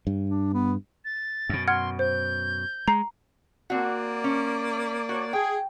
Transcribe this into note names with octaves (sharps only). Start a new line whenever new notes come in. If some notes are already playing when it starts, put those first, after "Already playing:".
G2
D4
B3
A6
F#2 B2
F#5 C6 F6 G#6
C5 G6
G#3 A#5 C7
A#3 C4 F#4 D5
C#4
F#4 C#5
G#4 G5